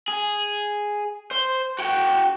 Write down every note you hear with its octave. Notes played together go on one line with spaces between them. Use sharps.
G#4
C5
F#4 G5